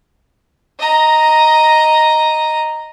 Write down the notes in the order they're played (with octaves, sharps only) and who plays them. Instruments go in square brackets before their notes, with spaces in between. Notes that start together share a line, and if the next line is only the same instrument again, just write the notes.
[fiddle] D#5 A#5